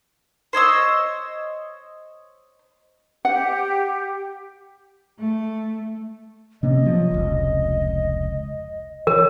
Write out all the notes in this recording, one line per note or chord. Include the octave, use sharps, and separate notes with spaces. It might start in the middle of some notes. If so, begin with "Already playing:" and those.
C5 C#5 D#5 E6
G4 F#5
A3
C3 A#3 C#4 D#5
F3 F#3
F1 C#2
E3 A#4 C#5